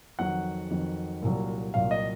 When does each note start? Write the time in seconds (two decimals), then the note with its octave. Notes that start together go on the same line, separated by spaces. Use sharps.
0.19 F2 D#3 F#3 F#5
0.71 F2 D#3 F#3
1.22 C2 A#2 F#3
1.74 C2 A#2 F#3 F5
1.91 D#5